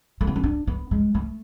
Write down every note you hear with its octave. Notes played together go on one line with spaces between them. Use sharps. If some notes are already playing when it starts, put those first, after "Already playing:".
A3
B3
C#4
D4
B3
G#3
A3